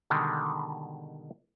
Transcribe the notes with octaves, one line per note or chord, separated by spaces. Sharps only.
B2 D3 D#3 G3 G#3